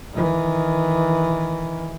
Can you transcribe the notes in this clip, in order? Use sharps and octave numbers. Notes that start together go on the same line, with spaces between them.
D#3 E3